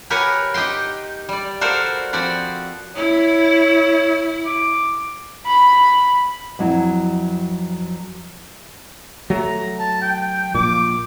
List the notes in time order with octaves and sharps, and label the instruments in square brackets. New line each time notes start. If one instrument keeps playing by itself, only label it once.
[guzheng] G4 A#4 B4 C#5 F#5 G#5
D#4 G4 D#5 G5 C6
G3 D5
F#4 A4 A#4 C5 D5 F5
F3 C4 F#4 D5 B5
[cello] E4 [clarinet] C#5
[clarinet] D6
[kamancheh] B5
[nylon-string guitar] F2 F#3 E4
[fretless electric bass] F#3 A3 [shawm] A#5
[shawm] A5
G5
[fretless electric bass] A#1 A#2 [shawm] D6